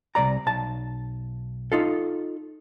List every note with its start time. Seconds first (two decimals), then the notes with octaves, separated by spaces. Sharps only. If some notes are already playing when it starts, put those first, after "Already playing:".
0.15 C2 A#2 D5 A#5
0.46 B1 A5
1.72 D#4 F4 A4